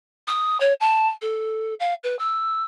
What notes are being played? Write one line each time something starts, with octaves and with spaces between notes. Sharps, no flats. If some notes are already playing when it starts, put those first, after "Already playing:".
D#6
C#5
A5
A4
F5
B4
E6